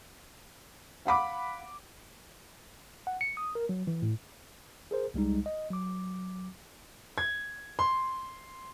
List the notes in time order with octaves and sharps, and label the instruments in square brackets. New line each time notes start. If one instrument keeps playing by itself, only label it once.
[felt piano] F5 F#5 B5 D6
[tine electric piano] F#5
C#7
D#6
A#4
F#3
E3
A2
G#4 A#4 C5
C2 G3 G#3 D#4
D#5
F#3 D6
[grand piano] G#6
C6